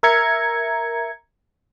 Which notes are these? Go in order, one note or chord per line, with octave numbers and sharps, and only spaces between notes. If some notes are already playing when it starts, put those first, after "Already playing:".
A#4 E5 A#5 G#6 C#7